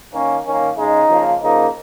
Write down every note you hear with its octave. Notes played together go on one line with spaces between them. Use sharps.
D#3 A#3 C#4
D#3 A#3 C#4
C#3 G#3 D#4
C#3 F3 A#3
C#3 F3 A#3 D#4